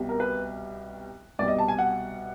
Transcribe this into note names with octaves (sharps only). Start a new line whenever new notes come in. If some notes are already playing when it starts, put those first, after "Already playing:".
Already playing: C2 B2 G3
A#4
B4
C2 B2 G3 D5
D#5
A5
G#5
F#5